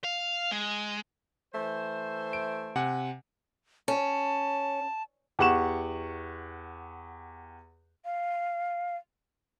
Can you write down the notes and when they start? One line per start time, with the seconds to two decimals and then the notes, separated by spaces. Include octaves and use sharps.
0.04 F5
0.52 G#3
1.54 E3 A3 C5
2.33 D7
2.75 C3 F#5 G#5
3.88 C#4 A5
5.39 E2 G4 F#5 C#6 E7
8.04 F5